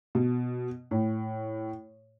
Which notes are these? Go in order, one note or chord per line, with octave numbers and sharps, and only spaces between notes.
B2
A2